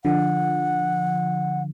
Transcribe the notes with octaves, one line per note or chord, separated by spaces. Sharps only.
D3 F3 F#5